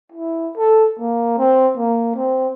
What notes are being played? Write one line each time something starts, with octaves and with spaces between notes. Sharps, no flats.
E4
A4
A#3
C4
A#3
C4